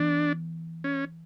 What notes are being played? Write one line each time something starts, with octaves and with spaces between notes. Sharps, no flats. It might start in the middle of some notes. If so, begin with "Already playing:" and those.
Already playing: E3 B3 D4
C#4